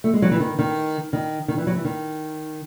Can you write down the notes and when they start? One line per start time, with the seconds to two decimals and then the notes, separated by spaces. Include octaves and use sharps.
0.04 A3
0.14 G#3
0.22 F#3
0.31 E3
0.40 D#3
0.59 D#3
1.13 D#3
1.48 D#3
1.58 E3
1.67 F#3
1.76 E3
1.85 D#3